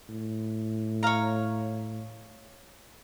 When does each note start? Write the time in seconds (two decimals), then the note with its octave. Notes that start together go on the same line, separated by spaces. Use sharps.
0.09 A2
1.03 C#5 F5 A#5